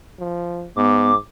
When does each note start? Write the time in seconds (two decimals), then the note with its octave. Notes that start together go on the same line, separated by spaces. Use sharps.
0.19 F3
0.76 G#2 B3 D6